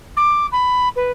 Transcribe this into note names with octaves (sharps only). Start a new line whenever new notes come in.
D6
B5
B4